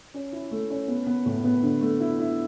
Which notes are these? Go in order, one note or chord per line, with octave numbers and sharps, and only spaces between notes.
C#4
E4
A3
C#4
B3
B3
A2
B3
D3
A3
E4
E4